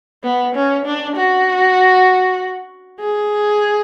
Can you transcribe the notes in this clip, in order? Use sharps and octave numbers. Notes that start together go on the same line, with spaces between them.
B3
C#4
D4
F#4
G#4